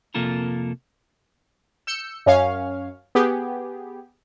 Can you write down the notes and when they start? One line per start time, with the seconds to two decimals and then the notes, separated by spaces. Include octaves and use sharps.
0.15 F2 C3 A#3 F4 A4 A#4
1.87 E6 G6 C#7
2.26 F#2 C#4 C#5 F5
3.15 B3 G4 G#4